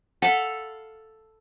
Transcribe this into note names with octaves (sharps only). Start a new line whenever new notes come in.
A4 F5 F#5 B5